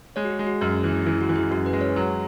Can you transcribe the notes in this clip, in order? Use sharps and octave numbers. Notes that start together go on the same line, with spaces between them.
G#3 C#5
F#4
G#4
G#3
F#4
F#2 F#4
E3
E3 E4
F#4
E3
G#4
F#2 F#4
B4
G#3
C#5
F#3